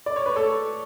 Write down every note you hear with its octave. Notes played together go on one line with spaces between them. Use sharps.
D5
C#5
B4
A4 C#5